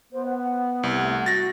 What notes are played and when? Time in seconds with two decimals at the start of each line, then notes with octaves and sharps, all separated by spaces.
0.12 B3 C5
0.25 F#5
0.37 F#5
0.83 C2
1.01 A3
1.26 F#4 A6 A#6